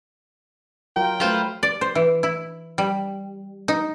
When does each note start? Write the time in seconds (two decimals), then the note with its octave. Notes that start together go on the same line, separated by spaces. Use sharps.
0.96 F#3 F4 A#4 G5
1.20 F#3 A3 F4 B4 C5
1.63 D5
1.81 C5
1.95 E3
2.23 E4
2.78 G3
3.68 D#4